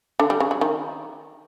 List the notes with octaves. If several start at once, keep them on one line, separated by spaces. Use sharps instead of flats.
D3
G3
C#3
F#3
D#3